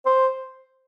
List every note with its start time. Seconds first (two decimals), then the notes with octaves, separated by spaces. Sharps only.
0.06 C5